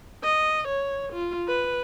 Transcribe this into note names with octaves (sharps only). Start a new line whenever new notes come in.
D#5
C#5
F4
B4